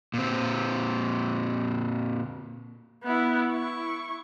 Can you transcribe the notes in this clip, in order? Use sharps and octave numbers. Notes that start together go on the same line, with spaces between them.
A#2 C4
B3 E4
E4 C#6